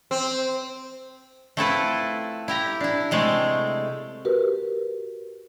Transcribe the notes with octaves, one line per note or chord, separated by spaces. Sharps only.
C4
A3 C4 E4 F4 A4 B4
E4 G4 A#5
D4 E4
C3 G#3 A3
F#4 G4 A#4 B4